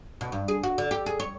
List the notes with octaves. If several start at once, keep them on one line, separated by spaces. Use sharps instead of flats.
B2
G2
G#4
F#4
D3
G4
G#4
C#5